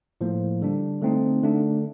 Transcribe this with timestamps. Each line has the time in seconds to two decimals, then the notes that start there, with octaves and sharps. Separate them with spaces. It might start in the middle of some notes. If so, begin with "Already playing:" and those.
0.21 A2 F3 A#3
0.61 D3 G3 D4
1.02 D3 A3 C4 D#4
1.43 D3 A3 D4